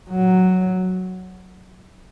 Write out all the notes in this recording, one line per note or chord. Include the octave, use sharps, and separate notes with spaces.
F#3